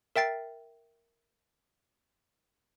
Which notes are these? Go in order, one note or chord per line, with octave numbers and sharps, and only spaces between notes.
A#4 E5 G5 A6 C7